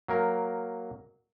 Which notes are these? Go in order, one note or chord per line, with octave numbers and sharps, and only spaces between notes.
F#3 A#3 A#4